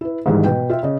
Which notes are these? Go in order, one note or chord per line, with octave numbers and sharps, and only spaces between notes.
E4 B4
G#2 D#3 E3 G3 G#3
B2 B4 G5
F4 E5 G5
C#3 D#5